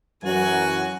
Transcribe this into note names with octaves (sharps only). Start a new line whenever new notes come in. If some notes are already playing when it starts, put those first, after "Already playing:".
F#2 E3 F#3 F#4 G#5